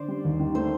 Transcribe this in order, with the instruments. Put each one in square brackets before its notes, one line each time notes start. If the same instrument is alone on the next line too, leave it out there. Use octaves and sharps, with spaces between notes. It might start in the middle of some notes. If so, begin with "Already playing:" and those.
Already playing: [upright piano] D3 [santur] C5 D5
[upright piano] G3
D#2
D#3
[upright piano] A3 [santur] C5